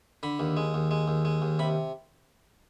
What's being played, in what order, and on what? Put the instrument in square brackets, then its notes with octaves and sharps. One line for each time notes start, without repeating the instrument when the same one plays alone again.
[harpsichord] D3 B5
D#2
G#3
D#2
G#3
D#2
G#3
D#2
C3 B5